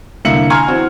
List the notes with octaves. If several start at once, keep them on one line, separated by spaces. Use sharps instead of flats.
C2 D3 A#3 E5 C#7 F#7
G#5 A#5 C6 C#6 F6 G#6
E3 C4 F#4